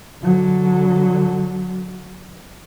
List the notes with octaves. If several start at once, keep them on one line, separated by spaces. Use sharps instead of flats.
D3 F#3